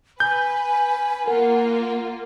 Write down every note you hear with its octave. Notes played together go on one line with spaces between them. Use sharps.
B4 G#5 G6
A#3 F4 A#4 F#5